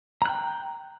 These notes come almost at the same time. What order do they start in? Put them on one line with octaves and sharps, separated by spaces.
A#5 F#6 G5